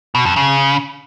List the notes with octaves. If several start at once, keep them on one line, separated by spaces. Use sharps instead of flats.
B2
F2
C#3